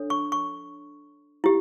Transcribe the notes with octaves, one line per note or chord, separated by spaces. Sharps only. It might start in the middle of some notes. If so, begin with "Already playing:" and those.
Already playing: D4 A4 C#5
C#6
C#6
E4 G4